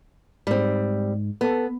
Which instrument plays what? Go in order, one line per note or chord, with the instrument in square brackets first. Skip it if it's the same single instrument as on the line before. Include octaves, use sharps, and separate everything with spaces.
[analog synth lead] G#2 [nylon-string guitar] G3 C4
[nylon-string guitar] B3 [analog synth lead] A4